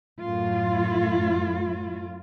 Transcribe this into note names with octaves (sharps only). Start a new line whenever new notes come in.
F#2 A2 F4